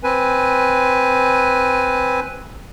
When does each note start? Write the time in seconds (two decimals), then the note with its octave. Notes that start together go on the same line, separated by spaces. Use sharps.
0.03 C4 B4 G#5